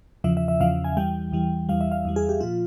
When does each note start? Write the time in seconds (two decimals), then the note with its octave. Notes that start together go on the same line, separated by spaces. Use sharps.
0.24 E2 C#3 F3 E5
0.37 E5
0.48 E5
0.60 E2 C#3 F3 F5
0.84 G#5
0.97 E2 E3 G3 G5
1.32 E2 E3 G3
1.69 E2 E3 G3 F5
1.81 E5
1.92 F5
2.05 E2 E3 G3
2.16 G#4
2.29 G4
2.40 A#2 F3 F4